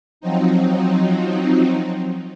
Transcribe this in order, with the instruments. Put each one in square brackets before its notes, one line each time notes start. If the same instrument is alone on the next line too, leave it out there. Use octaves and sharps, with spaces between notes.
[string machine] F3 F#3 C4 D#4